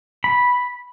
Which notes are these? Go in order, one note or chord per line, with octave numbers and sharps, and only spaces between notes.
B5